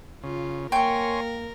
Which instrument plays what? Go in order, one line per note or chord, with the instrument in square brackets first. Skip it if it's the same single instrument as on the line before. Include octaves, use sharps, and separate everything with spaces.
[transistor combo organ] C#3 [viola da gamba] F4
[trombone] A#3 [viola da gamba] A#4 [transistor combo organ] C#5 G#5 C6 [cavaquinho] G5 C#6